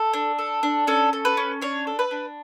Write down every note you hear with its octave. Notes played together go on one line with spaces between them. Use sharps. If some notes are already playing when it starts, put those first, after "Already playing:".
Already playing: A4
D4
A4
D4
C#4 A4
A4
B4
C#4
D4 C#5
A4
B4
D4